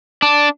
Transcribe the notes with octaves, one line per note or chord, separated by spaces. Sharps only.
D4